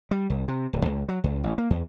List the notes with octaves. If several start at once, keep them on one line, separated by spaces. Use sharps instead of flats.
G3
C2
C3
D1
C#2
F#3
C#2
A1
A#3
E2